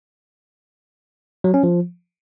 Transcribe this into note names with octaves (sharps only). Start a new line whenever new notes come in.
F#3
C#4
F3